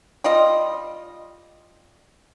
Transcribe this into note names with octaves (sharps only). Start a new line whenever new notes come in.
G3 F4 D#5